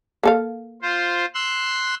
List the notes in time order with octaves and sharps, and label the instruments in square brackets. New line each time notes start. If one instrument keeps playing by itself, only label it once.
[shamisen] A#3 A4 F5
[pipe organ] F4 C5
C6 E6 F#6